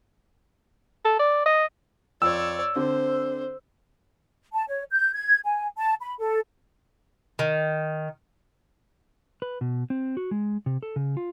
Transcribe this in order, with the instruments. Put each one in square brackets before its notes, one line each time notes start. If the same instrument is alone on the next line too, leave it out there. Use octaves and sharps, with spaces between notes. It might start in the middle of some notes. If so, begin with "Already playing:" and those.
[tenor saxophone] A4
D5
D#5
[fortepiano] F2 [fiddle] C#5 D5 [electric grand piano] E6
[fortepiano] D3 C4 [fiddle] C5
[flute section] A5
C#5
G6
G#6
G#5
A5
B5
A4
[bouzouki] D#3
[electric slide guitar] B4
B2
C4
F#4
G#3
C3
A4
C#3
F4